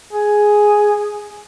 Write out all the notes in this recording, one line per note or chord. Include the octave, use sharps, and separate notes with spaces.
G#4